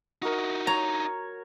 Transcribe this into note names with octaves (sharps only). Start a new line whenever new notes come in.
D#4 E4 F#4 A#4
C#5 A#5